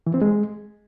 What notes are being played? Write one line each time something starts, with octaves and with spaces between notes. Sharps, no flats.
E3
C4
G#3